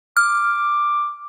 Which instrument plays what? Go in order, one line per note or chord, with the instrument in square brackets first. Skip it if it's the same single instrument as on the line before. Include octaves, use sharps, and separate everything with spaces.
[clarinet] D6 [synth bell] F6